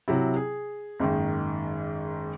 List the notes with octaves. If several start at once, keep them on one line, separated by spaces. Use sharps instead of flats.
C3 F#3 E4
G#4
F#1 G#2 D#3